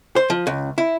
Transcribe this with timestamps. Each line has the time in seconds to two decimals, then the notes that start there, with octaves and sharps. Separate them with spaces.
0.16 C5
0.30 F3
0.47 C#2
0.78 E4